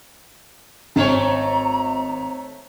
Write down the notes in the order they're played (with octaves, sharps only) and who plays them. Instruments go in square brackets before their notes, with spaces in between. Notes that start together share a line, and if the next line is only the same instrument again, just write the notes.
[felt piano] G#1 [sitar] A3 C4 C#5 [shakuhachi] A#5